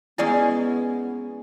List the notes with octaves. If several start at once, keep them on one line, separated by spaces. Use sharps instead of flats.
G#3 B3 C#4 E4 G#4 D5 C#6